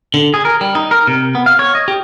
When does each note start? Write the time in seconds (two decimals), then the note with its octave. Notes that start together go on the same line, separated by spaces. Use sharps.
0.14 D3
0.34 G#4
0.45 A#4
0.61 G3
0.75 D#4
0.91 A#4
1.07 C3
1.35 B3
1.46 F5
1.59 C#5
1.75 D#5
1.88 G4